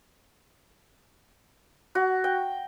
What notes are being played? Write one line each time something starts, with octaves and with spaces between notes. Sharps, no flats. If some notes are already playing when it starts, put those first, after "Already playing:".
F#4
G5